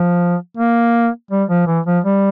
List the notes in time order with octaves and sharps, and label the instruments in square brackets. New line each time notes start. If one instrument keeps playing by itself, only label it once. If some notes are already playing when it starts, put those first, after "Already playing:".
Already playing: [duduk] F3
A#3
G3
F3
E3
F3
G3